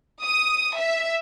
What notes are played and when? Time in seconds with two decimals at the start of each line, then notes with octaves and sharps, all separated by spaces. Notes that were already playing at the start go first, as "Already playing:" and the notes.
0.23 D#6
0.78 E5